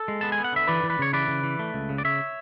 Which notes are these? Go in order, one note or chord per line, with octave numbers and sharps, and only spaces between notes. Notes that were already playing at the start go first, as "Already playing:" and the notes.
Already playing: A4
G#3
B3 A5
G#5
B3
F#5
D3 E5
E3 B4 D5
E3
B4
C#3 C#5
E3 B4 D5
C#3
E3
A3
C#2
C#3
D5
C#3 C#5 E5